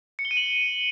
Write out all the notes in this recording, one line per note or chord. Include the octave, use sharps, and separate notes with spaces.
C#7
G7
D#7
F#7